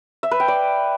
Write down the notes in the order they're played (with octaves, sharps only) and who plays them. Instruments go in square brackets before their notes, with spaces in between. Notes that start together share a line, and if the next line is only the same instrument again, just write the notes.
[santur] E5
B4
G5
D5